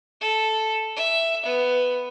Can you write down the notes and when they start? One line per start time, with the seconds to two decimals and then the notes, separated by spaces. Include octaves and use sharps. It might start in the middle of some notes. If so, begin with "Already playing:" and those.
0.20 A4
0.96 E5
1.45 B3